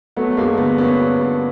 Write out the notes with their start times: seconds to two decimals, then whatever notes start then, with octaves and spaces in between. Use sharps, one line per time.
0.16 F#3 A3 B3
0.31 A3
0.37 G2 G#3 A#3
0.58 D3 A3 B3
0.78 G2 B3 C#4
0.98 F#3
1.20 G2